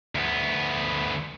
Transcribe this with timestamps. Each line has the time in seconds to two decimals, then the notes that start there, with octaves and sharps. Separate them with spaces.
0.15 D2 B3